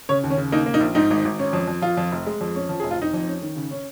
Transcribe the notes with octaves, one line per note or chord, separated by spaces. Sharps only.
C#3 C#5
D#2
C#4
C#3
A#3 D#4
A#3
D#4
A#1
G#2 D#4
G#1
G#1
C#4
F2
F2
F2 F4
F2
F1
G#3
F2
C#4
F3
G#4
F1
F4
F1 D#4
F2
C#4
D#3
C#3
C#4